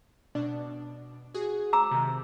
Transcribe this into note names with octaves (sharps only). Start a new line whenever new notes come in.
B2 D4 D5
F#4 G#4
A#5 D6 E6
C3 D#3